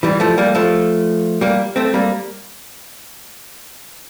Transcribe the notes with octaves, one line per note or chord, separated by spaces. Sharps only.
E3 G3
F3 A3
G3 A#3
F3 A3
G3 A#3
A3 C4
G3 A#3